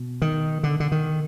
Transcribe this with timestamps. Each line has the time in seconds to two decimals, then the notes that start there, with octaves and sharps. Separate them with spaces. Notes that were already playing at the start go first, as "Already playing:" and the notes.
Already playing: B2
0.22 D#3
0.63 D3
0.80 D3
0.92 D#3